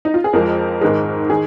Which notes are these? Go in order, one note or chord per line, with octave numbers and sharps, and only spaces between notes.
D#4
F4
G#4
F2 F3 G#3 A#4
G#2 D#3 G#3
D#3 G#4